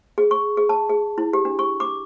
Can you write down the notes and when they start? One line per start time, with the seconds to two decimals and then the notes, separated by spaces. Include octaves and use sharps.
0.18 G#4
0.31 C#6
0.57 G#4
0.69 A5
0.90 G#4
1.18 E4
1.33 G4
1.45 D4
1.59 C#6
1.80 D6